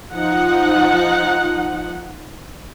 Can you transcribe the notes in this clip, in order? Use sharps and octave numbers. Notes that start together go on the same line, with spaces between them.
F3 D#4 F#5